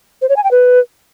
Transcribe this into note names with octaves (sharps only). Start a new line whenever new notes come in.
C5
C#5
G#5
G5
B4